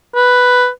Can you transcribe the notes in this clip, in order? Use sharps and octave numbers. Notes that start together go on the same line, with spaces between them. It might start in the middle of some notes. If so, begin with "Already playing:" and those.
B4